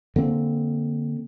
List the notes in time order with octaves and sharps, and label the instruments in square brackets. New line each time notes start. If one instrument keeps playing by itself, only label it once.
[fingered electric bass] D3 A#3 C4